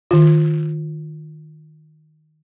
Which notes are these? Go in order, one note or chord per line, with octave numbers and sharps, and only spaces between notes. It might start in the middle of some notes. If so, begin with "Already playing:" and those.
D#3 F4